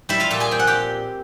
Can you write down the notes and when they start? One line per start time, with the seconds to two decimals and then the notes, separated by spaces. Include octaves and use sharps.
0.09 G3 E4 E5
0.20 F4 F5
0.31 A#2 A4 A5
0.40 G#4 G#5
0.51 C4 G5
0.59 F#5
0.67 G4 G5